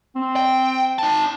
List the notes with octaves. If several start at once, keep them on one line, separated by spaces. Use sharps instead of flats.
C4
G5
D#4 A5